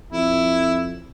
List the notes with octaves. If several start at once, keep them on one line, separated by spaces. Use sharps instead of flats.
F2 E4